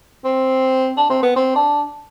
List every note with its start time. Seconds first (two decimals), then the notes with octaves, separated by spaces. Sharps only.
0.24 C4
0.97 D4
1.09 C4
1.22 B3
1.36 C4
1.55 D4